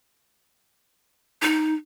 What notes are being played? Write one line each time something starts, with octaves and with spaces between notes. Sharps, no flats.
D#4